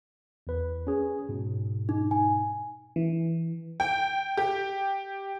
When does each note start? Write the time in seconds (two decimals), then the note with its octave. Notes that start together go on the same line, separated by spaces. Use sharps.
0.47 E2 B4
0.87 C#4 G#4
1.29 G#2 B2
1.89 D#4
2.11 G#5
2.96 E3
3.80 G5
4.37 G4